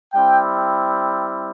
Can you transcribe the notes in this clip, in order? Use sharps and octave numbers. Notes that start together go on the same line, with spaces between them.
G3 C4 E4 G5